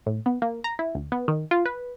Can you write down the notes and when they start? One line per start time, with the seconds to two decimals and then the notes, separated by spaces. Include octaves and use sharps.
0.06 A2
0.26 B3
0.42 A#3
0.64 A#5
0.79 E4
0.95 D2
1.12 B3
1.28 D#3
1.51 F4
1.65 B4